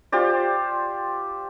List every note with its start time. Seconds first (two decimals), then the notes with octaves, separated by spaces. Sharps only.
0.12 F4 G4 C5 D5